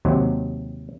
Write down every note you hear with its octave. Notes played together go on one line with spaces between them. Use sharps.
D#2 C3 F#3